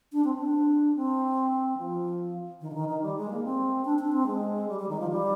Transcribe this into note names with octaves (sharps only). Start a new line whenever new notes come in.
D4
C4
D4
C4
F3
D#3
D3
D#3
D#3
G3
G#3
A#3
C4
D4
D4
C4
G#3
G3
G3
D#3
F3
G3